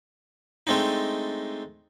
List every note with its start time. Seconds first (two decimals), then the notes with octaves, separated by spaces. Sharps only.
0.67 G#3 A3 C4 D4 D#4